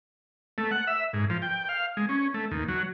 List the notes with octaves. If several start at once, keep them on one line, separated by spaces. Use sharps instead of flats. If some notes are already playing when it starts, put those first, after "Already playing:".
A3
F#5
E5
G#2
F3
G5
F5
G#3
C#4
A3
D#2
F#3